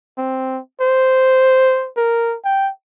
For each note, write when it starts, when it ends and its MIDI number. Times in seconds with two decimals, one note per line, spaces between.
0.18 0.60 60
0.81 1.89 72
1.97 2.36 70
2.44 2.70 79